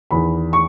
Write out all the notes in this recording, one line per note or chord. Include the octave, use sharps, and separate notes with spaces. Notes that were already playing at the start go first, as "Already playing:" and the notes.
E2 D#3 B5
C#6